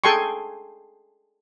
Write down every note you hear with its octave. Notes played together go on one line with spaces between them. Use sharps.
G#4 A4 G5 G#5 C6 C#6